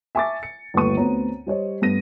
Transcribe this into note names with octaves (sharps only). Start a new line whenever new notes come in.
E5 G#5 A5 C#6 D6 A6
C#7
G1 D#2 A3 B4 C#6 D#7
D2 B3 C4 C5 C#5 A#5
G3 C5 C#5 D#5
G2 A3 B3 A#6 D#7